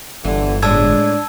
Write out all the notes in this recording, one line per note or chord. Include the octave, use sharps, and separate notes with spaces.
G1 D3 E3
A2 G#3 D4 A5 E6 G#6